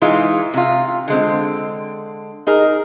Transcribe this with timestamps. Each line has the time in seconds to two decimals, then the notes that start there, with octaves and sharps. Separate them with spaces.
0.02 E3 G#3 D#4 F4
0.54 C3 F4
1.08 D3 G#3 C4
2.47 D#4 G#4 A#4